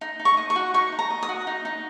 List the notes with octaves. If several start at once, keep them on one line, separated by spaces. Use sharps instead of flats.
D#4
D#4
C#6
D#5
C#6
F#4
D#4 C#6
D#4
A#5
D#5
D#6
F#4
D#4
D#4